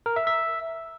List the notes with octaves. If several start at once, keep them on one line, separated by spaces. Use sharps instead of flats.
A#4
E5
E5